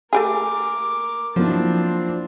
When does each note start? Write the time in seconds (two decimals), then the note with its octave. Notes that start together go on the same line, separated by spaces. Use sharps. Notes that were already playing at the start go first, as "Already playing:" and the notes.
0.13 A3 G4 G#4 A#4 D6
1.36 F3 F#3 A#3 C4 D4 E4